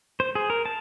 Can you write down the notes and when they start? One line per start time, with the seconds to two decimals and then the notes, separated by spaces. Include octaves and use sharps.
0.20 C5
0.35 G#4
0.50 A#4
0.66 A5